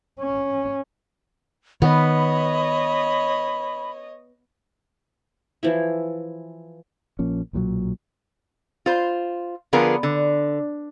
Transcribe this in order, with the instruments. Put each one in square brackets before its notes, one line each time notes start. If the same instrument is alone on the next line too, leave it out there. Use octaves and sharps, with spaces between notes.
[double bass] C#4
[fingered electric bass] D#3 [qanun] B3 [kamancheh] C#5 D#5 [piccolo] B5
[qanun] E3 F3 E4
[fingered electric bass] A#1 F3 A#3 C#4
B1 A#2 F3 F#3
[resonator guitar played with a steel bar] F4 C5
D3 F3 B3 F4 G#4 A#4
D3